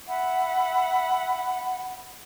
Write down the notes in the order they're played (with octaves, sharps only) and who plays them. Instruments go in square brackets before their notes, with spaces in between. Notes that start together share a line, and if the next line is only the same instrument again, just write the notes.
[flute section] E5 F#5 B5